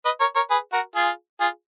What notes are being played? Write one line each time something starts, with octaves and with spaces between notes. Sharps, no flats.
B4 D#5
A#4 C#5
A#4 C#5
G#4 B4
F#4 A#4
F4 G#4
F4 G#4